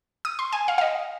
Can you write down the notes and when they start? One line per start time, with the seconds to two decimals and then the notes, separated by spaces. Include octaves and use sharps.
0.25 D#6
0.39 C6
0.53 G#5
0.68 F5
0.78 F5
0.81 D#5